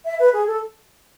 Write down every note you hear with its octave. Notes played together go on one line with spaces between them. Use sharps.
E5
B4
G#4
A4